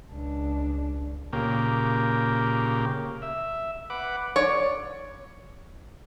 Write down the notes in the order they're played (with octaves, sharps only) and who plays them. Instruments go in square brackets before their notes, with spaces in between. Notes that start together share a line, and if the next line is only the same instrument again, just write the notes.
[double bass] C#2 D4
[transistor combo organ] A#2 C#3 A#3 G4
E5
B4 F#5 D6
[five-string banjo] C#5 D5